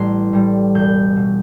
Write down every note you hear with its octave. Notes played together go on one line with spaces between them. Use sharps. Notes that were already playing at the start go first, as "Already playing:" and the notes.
Already playing: A1 A2 G3 C6
A2 G3
E1 G6
B2